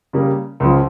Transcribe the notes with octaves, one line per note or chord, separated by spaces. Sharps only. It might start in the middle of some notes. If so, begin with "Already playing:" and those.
C#3 G3 A#3
C#2 C#3 F3